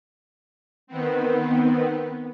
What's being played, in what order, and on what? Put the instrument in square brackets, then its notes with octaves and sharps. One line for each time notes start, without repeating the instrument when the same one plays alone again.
[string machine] D#3 B3 C4